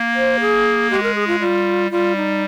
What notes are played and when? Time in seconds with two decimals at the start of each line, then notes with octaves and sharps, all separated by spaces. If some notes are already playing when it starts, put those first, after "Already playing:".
Already playing: A#3
0.15 C5
0.40 G#4
0.91 G#3 G4
1.03 A#4
1.15 G#4
1.27 F4
1.40 G3 F4
1.91 G3 F4
2.16 D#4